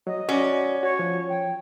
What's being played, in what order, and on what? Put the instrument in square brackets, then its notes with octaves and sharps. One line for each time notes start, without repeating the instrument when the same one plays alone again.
[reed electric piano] F#3 [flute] D#5
[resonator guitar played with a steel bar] C#4 [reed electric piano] F#4 D5
[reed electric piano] F#4 [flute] C#5
[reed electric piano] F3
[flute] G5